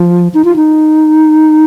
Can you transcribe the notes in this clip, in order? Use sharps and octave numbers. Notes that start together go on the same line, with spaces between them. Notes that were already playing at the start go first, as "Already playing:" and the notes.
Already playing: F3
D#4
F4
D#4